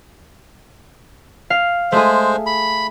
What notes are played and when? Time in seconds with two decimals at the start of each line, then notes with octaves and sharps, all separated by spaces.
1.50 F5
1.92 G#3 A3 G#4 C5
2.46 B5